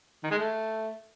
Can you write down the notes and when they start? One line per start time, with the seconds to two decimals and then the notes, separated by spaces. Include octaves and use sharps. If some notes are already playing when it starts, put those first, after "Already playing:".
0.23 D#3
0.31 G#3
0.38 A3